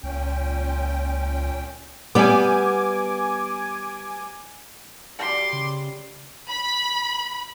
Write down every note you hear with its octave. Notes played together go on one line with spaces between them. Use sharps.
C#2 A#2 C#4 G5
G3 B3 G#5 D6
G3 C6 D6
C#3
B5